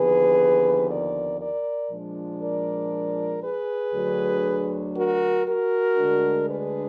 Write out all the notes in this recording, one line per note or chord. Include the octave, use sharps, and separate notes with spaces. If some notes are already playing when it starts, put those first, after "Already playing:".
Already playing: D#2 D3 F3 B3 G#4 B4
A#4 D5
A#4 D5
A#2 F3 G#3 D4
A#4 D5
G#4 B4
D2 D3 F#3
F#4 A#4
F#4 A#4
D2 D3 G#3 D4
G#4 B4